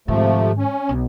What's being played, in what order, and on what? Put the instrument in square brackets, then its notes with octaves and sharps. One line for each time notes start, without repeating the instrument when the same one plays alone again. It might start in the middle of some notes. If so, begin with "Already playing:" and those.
[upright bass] G#2 D#3 [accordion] C3 F3 A3
[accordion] C#4
[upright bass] B1